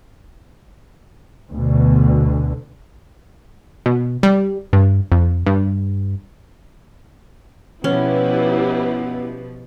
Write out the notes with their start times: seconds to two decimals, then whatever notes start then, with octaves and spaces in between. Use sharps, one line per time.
1.51 D2 B2 D3
3.86 B2
4.23 G3
4.73 G2
5.12 F2
5.46 G2
7.84 B2 F3 B3 C#4 E4 G4 B4